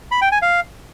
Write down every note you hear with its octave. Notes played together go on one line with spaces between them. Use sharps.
B5
G5
G#5
F5